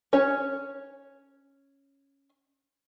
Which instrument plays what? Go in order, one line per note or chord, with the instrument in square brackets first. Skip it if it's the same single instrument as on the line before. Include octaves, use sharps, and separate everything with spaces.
[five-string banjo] C#4 C#5